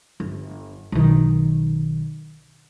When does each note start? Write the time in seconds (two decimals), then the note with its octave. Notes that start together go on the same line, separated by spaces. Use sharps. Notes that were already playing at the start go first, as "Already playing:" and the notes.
0.20 G1
0.92 B1 D#3